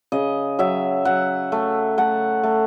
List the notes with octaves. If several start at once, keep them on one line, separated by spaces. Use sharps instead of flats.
C#3 D#5
F#3 E5
F#3 F#5
A3
A3 F#5
A3